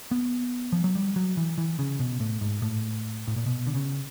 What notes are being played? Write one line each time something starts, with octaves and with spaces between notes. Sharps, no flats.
B3
F3
F#3
G3
F#3
E3
E3
C#3
B2
A2
G#2
A2
A2
A#2
B2
D3
C#3